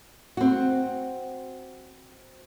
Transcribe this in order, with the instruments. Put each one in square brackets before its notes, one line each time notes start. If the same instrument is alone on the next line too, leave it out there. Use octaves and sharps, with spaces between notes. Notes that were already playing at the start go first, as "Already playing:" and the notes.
[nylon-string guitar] C4 F#4